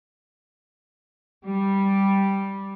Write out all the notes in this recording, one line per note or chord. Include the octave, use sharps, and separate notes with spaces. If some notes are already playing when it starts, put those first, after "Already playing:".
G3